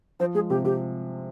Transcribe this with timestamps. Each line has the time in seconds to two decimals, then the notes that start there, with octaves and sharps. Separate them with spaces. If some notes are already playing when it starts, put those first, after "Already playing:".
0.20 F3 C5
0.35 G#3 G#4
0.50 C3 G4
0.64 C3 G4